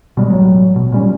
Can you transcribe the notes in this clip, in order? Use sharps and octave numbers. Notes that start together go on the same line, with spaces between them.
B2 G3 G#3
A1 F#3
B2
A#2 G3 C#4